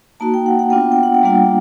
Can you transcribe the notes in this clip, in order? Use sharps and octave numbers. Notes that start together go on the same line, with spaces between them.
A#3 D#4 F#4 A5
G5
F#5
F#5
B3 D4 F4 G5
F#5
G5
F#5
G5
G3 A#3 D4 F4 F#5
G5